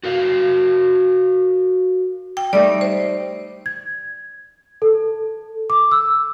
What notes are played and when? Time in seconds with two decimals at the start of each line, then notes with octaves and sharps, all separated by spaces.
0.04 F#4 A#4 F5
2.37 G5
2.53 G3 A3 D#4 D5
2.81 C5
3.66 G#6
4.82 A4
5.70 D6
5.92 E6